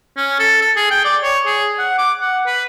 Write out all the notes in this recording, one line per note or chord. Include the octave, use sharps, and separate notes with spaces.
C#4
A4
A4
G#4
G5
D5
C#5
G#4
F#5
D6
F#5
B4